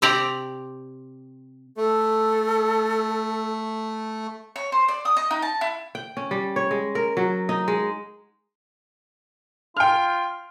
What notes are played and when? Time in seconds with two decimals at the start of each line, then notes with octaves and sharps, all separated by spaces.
0.02 C3 C4 G4 D5 A#5
1.77 A3 A4
4.56 C#5
4.72 C5
4.88 D5
5.05 D#6
5.17 D#5
5.31 D#4
5.42 A5
5.61 E4
5.95 G5
6.17 C#4
6.31 G3
6.56 C#5
6.71 G#3
6.95 A#4
7.17 F#3
7.49 D#4
7.68 G#3
9.77 F4 G5 F6